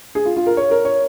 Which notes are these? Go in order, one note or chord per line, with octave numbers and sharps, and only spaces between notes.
G#4
F4
F4
A#4
C#5
A#4
C#5